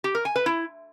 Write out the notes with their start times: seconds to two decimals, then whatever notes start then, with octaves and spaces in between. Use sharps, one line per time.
0.04 G4
0.15 A#4
0.25 G#5
0.36 B4
0.46 E4